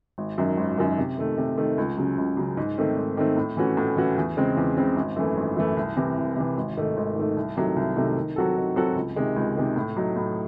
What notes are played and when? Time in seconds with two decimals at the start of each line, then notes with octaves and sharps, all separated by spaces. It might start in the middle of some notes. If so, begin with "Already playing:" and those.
0.18 G#1
0.38 F#2 D#3 F#3
0.57 G#1
0.77 F#2 D#3 F#3
0.98 C3
1.18 D#3 A3
1.38 C3
1.57 D#3 A3
1.78 C#2
1.97 C#3 F#3
2.18 C#2
2.37 C#3 F#3
2.57 G#2
2.78 D#3 A3 C4
2.97 G#2
3.17 D#3 A3 C4
3.37 A2
3.57 E3 A3 C#4 F#4
3.77 A2
3.97 E3 A3 C#4 F#4
4.18 E2
4.37 C#3 G#3 C4
4.57 E2
4.78 C#3 G#3 C4
4.96 G#1
5.16 F#2 E3 A3
5.37 G#1
5.56 F#2 E3 A3
5.77 C2
5.97 C3 E3
6.17 C2
6.36 C3 E3
6.57 G#1
6.77 G#2 D#3 A3
6.97 G#1
7.16 G#2 D#3 A3
7.37 C2
7.57 C3 D#3 F#3 A3
7.76 C2
7.97 C3 D#3 F#3 A3
8.17 D#3
8.36 F#3 C4 F#4 A4
8.57 D#3
8.76 F#3 C4 F#4 A4
8.96 C#2
9.16 C3 D#3 G#3
9.36 C#2
9.57 C3 D#3 G#3
9.76 A2
9.97 F#3 A3 D#4
10.16 A2